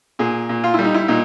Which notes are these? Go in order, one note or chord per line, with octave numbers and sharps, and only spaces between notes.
A#2 G#4
A#2
F4
G3 E4
D#4
E4
A#2 D#4